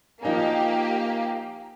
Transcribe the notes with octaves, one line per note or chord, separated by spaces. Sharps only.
F3 A#3 D#4 G4 G#5